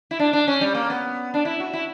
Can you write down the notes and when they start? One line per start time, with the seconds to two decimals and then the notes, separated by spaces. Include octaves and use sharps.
0.11 E4
0.19 D4
0.33 D4
0.48 C#4
0.61 G3
0.75 A#3
0.90 B3
1.34 D4
1.45 E4
1.60 F#4
1.73 E4